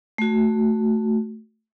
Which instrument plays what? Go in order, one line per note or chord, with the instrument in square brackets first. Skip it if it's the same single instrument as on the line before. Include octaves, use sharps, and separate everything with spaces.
[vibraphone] A3 F#4